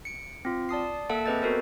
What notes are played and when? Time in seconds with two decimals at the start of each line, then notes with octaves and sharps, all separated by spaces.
0.05 C#7 D7
0.45 C4 F4
0.69 D5 A5 D#6 C7
1.09 A#3 A4 E5 F#5 A5 D7
1.26 C4 G#4 B4 D#5 G6 A6
1.42 B3 F#4 A4 A#4 C5